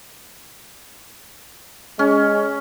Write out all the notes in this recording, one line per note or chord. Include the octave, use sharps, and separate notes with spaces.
G#3 C#4